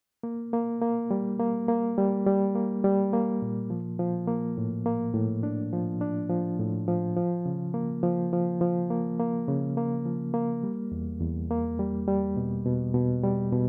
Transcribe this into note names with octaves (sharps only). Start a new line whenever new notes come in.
A#3
A#3
A#3
G3
A#3
A#3
G3
G3
A#3
G3
A#3
A#2
F3
F3
A#3
A2
A#3
A2
D4
F3
D4
F3
A2
F3
F3
C#3
A#3
F3
F3
F3
A#3
A#3
C#3
A#3
F3
A#3
G3
E2
E2
A#3
G3
G3
B2
B2
B2
G3
B2